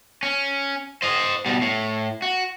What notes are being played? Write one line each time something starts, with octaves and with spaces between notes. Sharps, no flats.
C#4
C5 D#5
B2 G3
A2
F#4